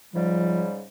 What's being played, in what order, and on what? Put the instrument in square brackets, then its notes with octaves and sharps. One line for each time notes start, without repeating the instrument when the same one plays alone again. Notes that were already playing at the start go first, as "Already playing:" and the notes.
[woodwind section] G#2 C#3 G3 [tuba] F3